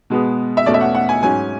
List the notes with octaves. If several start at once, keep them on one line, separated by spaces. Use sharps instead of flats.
B2 G#3 B3
E5
E2 B2 A3 C#4 D5
E5
F#5
F#5
G#5
G#2 F#3 C#4 G#5